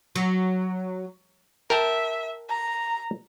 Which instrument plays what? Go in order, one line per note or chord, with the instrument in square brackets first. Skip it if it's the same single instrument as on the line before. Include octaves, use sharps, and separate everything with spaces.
[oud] F#3
[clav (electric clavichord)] A#4 G5 A5 [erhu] E5
[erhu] A#5